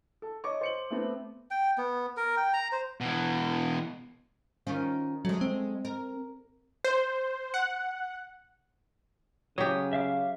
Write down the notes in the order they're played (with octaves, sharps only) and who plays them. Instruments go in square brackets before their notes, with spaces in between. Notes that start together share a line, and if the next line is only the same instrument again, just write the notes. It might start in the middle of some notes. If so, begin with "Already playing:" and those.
[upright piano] A4
C#5 D#5 C#6 D6
C5 C#7 F#7
A3 B3 C4
[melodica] G5
B3
A#4
G5
A#5
C5
[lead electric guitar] B2 E3
[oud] D#3 C#4 F4
[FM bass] F#3 [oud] G#3 A3
[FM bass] C4
[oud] A#4
[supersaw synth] C5
F#5
[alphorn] C#3 [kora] F#3 G4 [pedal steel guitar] D#6
[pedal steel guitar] E5 F5 D6